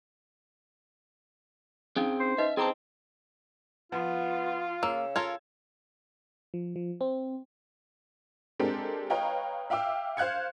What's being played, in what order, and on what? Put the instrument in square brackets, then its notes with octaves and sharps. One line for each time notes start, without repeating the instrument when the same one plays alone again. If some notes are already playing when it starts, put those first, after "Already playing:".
[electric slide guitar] C4 G#4 G5 [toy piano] C#4 D#4 F5
[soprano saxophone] C5
[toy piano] D#4 B4 D#5 [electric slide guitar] E5
[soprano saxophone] C4 [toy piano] E4 A#5 D6 [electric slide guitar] G#4 C5 A5
[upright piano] F3 [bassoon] B3 [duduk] F4
[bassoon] C#3 [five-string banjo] A#3 [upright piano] E6
[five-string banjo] F4 A4 A#4 [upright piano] G#6
[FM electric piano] F3
F3
C4
[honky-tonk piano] G#3 C4 D4 G4 A4 A#4
B4 C#5 D#5 F5 G5 A#5
E5 F5 G5 D6 E6
C5 F5 F#6 G#6 C#7